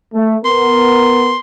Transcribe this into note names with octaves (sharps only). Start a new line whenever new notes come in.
A3
B3 A#4 C6